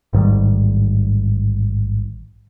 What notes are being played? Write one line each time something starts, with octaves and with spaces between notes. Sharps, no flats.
A1 G#2 D#3 G3